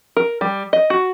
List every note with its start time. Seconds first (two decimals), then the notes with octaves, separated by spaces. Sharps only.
0.17 A#4
0.41 G3
0.73 D#5
0.90 F#4